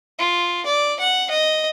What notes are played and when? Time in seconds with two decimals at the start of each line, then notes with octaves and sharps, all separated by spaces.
0.19 F4
0.66 D5
1.00 F#5
1.30 D#5